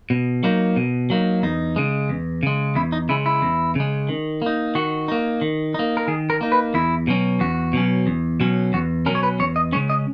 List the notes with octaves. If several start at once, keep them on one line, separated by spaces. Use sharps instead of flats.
B2
F#3 A#3 D#4
B2
F#3 A#3 D#4
E2 D#4
C#3 G#3
E2
C#3 G#3
E2 E4
D#4
C#3 G#3 E4
E4
E2
C#3 G#3
D#3
A#3 D#4
D#3 F#4
A#3 D#4
D#3
A#3 D#4
A#4
D#3 G#4
A#4
A#3 D#4
B4
E2 E4
B2 F#3 C#4
E2 F#4
B2 F#3 C#4
E2
B2 F#3 C#4
E2 F#4
B2 F#3 C#4 A#4
C#5
B4
E2 C#5
D#5
C#3 G#3 C#4 C#5
D#5